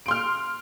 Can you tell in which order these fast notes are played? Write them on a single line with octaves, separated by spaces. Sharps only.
D7 C6 F6